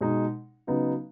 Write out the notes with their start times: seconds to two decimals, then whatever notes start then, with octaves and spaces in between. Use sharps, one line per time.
0.01 B2 G#3 D#4
0.67 C#3 F#3 B3 D#4